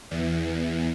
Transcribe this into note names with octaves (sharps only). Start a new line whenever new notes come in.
E2